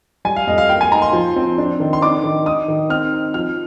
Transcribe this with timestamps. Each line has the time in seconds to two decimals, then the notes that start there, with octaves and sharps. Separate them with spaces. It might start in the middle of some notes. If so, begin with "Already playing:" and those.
0.25 G3 G#5
0.36 F5
0.47 F2 D#5
0.58 F5
0.69 A#3 G5
0.81 G#5
0.92 D#4 A#5
1.02 C6
1.13 F3
1.36 C4
1.58 D4
1.80 D#3
1.93 C6
2.02 D4 D6
2.24 D#3
2.46 D#4 D#6
2.68 D#3
2.90 C4 F6
3.13 D#4
3.34 F3 F6